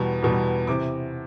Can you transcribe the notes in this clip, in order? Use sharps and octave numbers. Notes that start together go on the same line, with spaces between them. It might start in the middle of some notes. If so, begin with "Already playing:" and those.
Already playing: E2 B2 G3
E2 B2 G3
C3 E3 D6